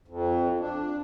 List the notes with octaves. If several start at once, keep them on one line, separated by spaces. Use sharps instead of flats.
F2
D4